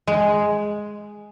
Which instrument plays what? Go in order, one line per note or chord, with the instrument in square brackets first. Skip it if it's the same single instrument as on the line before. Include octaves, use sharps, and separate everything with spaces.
[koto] G#3